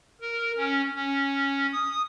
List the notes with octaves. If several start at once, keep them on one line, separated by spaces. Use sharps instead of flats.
A#4
C#4
C#4
D#6